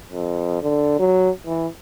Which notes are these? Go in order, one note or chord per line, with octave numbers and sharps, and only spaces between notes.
F2
D3
F#3
E3